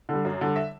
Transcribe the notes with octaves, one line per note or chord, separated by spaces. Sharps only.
D3 G3
F#2
D3 G3
E5